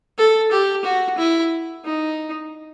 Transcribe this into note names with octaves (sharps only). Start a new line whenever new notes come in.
A4
G4
F#4
E4
D#4